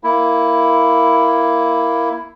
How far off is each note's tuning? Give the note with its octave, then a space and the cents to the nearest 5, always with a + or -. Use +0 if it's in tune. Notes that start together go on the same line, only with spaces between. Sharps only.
A#3 +0 E4 +5